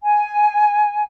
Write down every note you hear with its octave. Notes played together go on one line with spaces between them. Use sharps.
G#5